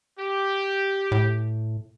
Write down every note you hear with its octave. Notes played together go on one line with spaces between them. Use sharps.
G4
A2